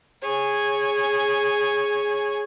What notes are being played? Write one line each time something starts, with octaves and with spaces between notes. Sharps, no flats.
G#4 C#5